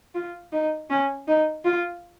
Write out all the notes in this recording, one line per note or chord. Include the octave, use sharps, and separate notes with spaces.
F4
D#4
C#4
D#4
F4